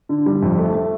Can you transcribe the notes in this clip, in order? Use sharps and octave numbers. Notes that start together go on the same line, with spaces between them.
D3
G3
F2
A3
A3